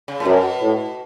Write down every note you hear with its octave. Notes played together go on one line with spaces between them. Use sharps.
C#3
A2
F#2 B2
A2